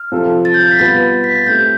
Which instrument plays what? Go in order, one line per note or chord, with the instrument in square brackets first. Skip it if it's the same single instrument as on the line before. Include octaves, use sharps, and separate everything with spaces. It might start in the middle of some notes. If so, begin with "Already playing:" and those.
Already playing: [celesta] F6
[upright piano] C3 F3 C4 F4 A4
[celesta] A6
G6
A6
B6
G6
[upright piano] B2 G3 B3 F4 B4 [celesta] A6
[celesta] B6
A6
[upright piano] A3 C4 G4 [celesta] G6